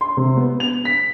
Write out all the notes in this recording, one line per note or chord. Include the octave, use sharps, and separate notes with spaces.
C6
C3
B3
F7
B6